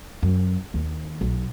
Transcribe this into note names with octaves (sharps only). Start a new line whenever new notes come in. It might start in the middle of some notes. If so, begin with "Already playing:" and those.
F#2
D#2
B1